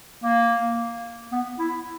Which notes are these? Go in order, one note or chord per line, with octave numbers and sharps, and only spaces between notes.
A#3
B3
E4